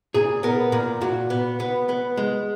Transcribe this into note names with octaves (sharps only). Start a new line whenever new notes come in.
A#2 G#4
B3 A#4
A#2 A#4
A#2 F#4
B3
B3
B3
G#3